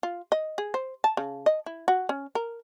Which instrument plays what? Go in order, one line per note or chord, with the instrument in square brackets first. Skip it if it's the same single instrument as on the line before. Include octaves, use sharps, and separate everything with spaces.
[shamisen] F4
D#5
G#4
C5
A5
C#3
D#5
E4
F#4
C#4
A#4